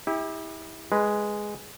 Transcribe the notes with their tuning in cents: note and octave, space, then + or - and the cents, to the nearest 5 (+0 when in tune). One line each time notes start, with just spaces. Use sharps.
E4 -30 G4 +30
G#3 +0 B4 +0